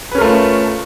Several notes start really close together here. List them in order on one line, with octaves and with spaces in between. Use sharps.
B4 C#4 A#4 A3 F4